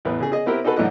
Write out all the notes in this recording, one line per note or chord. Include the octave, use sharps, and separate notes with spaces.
A1 E2 B4
C#3 G#4
G#4 D#5
B3 C4 E4 G4 A#4 B4
D#4 F#4 G#4 A4 B4
B1 A2 D3 E3 D#5 F#5